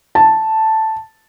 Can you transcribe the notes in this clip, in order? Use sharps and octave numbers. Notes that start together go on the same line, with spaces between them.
A5